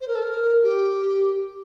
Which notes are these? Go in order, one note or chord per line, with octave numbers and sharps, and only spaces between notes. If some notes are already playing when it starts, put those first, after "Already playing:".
C5
A#4
A4
A#4
G4